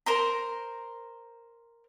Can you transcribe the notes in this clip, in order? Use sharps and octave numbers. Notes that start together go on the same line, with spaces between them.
A#4 C5 A#5